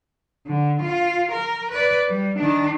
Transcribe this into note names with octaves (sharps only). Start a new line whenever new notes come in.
D3
F4
A#4
B4 D5
G3
D#3 D4